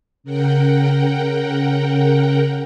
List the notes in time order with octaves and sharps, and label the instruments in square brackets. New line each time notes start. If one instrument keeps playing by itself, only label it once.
[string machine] C#3 A#4 F#5 G5